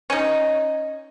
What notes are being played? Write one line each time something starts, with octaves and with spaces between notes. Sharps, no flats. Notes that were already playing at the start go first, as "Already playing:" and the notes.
C#4 D#4